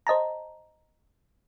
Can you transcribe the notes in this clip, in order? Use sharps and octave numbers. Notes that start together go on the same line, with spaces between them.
C5 D#5 A5 A#5